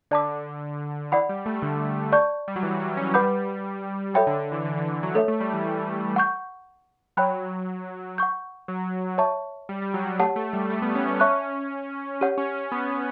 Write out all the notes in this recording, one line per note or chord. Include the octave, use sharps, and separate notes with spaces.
D3 D5 A5 D6
E3 D5 F#5 B5
G3
A3
D3
D5 A5 C#6 G6
G3
F#3
E3
F#3
C#4
G3 B4 F#5 B5 D6 G6
F#3 A4 C#5 E5 G5 B5
D3
D3
E3
D3
E3
E3
F#3
A3 A4 C#5 E5
A3
G3
E3
E3
F#5 C#6 G6
F#3 C#5 G5 B5 F#6
F#5 C#6 G6
F#3
C#5 E5 A5 C#6
G3
G3
F#3
G3
A3 G4 C#5 F#5 A5
A3
G3
A3
B3
C#4
C#4 C#5 E5 A5 C#6 F#6
C#4 G4 C#5 F#5
C#4
C#4
B3